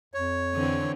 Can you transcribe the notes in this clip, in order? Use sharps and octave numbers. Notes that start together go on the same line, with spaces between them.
F2 C#5
D3 E3 C4